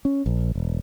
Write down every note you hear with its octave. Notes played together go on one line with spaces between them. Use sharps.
C#4
A#1
E1